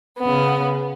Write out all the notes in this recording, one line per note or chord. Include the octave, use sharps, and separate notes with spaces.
C#3 B3